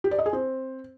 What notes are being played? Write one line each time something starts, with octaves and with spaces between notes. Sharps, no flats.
G4
D5
D#5
G#4
C4